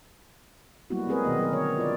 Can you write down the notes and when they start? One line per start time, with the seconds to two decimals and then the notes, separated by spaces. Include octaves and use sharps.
0.90 F#3 G3 A#3 B3 E4 F#4
1.07 G#3 B3 C4 G#4 A#4 B4
1.25 B2 D#3 B3 D#5
1.39 F#3 B3 A#4
1.52 D3 C#5
1.78 F4 D5